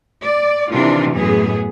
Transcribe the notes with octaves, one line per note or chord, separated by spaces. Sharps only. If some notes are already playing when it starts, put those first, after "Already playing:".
D5
C3 D#3 E3 D4 F4
F#2 A2 B3 G#4